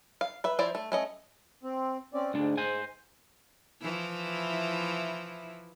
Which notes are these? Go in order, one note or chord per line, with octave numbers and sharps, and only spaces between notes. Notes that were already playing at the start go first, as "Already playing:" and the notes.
F5
B4 E5
F3 E4 C5 D5
A3
A3 C#4 D#5
C4
C4 C#4 D5
D2 G#2 D4
C5 G#5
E3 F3 E4